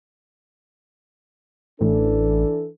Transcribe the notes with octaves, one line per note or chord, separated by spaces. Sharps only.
A1 E3 D4 A4